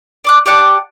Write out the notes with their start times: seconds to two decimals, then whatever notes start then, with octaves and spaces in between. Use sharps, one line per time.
0.24 D5 D6 F#6
0.46 G4 D5 F#5 A5